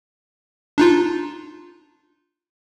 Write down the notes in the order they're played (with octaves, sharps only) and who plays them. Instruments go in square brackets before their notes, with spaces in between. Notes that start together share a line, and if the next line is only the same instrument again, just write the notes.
[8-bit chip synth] D4 D#4 F4